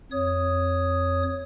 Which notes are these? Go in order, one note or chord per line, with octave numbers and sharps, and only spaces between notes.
F2 C#5 D#6